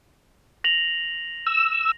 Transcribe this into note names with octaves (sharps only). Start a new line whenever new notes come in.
A#6 F7 F#7
E6